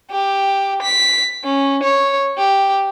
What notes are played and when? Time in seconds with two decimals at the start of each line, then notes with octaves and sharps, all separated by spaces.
0.11 G4
0.82 B6
1.44 C#4
1.83 C#5
2.39 G4